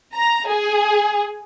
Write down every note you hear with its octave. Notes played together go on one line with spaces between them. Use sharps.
A#5
G#4